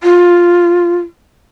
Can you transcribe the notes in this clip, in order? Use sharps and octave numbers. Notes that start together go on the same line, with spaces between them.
F4